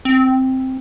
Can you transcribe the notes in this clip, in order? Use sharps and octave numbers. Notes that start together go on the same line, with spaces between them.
C4